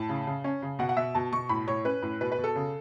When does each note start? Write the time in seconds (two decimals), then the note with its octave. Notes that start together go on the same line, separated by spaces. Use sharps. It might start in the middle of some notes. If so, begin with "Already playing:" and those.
Already playing: A2 A5
0.09 C#3
0.27 C#3
0.44 C#4
0.62 C#3
0.79 B2 F#5
0.89 F#5
0.97 B2 E5
1.15 B2 A5
1.32 B2 C#6
1.49 A2 B5
1.67 A2 C#5
1.85 C#4 B4
2.02 A2
2.21 B2 B4
2.32 B4
2.38 B2
2.44 A4
2.55 C#3